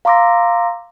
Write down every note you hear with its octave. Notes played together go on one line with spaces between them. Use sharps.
F5 A#5 C6 D6 E6 A#6